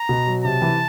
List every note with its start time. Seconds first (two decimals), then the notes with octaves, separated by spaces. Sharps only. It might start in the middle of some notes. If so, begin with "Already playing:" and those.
Already playing: A#5
0.09 B2
0.27 F#3
0.44 C3 A5
0.62 E3